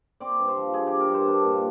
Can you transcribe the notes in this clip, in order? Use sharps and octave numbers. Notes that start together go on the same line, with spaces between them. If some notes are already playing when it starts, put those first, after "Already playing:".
C4 D5
G2
C5
F3
G2 G#4
G4
C4
A#4
G2
C5
D4
A#2